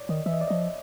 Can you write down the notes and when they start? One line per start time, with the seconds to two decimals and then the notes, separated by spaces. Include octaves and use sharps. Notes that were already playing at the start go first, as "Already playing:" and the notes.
Already playing: C#5 D5
0.09 D#3 D#5
0.26 E3 E5
0.33 D#5
0.41 D5
0.48 F3 D#5